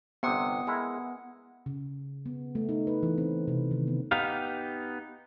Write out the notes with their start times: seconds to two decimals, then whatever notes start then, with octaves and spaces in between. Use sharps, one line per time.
0.23 G1 C3 B3 F#5 D#6
0.67 G#3 E4 A#4
1.66 C#3
2.26 B3
2.55 A3
2.69 D#4
2.87 B4
3.03 E3
3.18 C4
3.48 C3
3.71 D#3
3.87 B3
4.11 B3 D#4 G4 F5